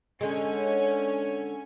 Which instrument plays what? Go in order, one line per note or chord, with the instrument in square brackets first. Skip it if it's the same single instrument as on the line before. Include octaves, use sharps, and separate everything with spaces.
[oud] D3 G#3 [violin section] C#4 G#5